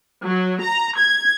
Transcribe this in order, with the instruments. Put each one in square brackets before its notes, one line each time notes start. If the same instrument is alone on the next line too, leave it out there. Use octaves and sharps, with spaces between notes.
[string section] F#3
A#5
G#6